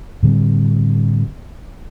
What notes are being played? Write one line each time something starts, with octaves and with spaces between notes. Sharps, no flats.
A2 D3 G3 C4